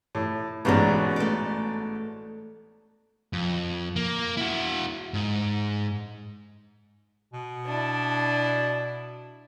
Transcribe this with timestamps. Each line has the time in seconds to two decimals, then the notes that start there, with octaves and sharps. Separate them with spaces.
0.15 A2
0.65 A1 G#2 B2 B3 C#4 D4
1.16 A3 D5
3.33 F2
3.96 A#3
4.37 E4 F#4
5.14 G#2
7.33 B2
7.66 D4 E4